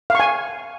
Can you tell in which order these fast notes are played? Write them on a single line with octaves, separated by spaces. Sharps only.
F5 C#6 G#5